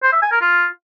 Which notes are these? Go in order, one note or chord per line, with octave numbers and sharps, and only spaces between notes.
C5
E5
G#5
A#4
F4